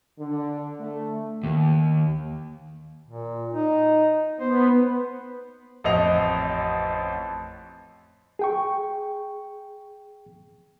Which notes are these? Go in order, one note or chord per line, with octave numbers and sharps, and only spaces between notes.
D3
A3
D#2
A#2
D#4
B3 C5
A1 F2 D#5 F7
G#4 G5 C#6